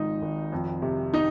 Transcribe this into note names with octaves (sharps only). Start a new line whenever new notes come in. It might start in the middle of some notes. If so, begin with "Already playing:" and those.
Already playing: G#1 G#2 F3 D#4
G#1
F2
C3
D#4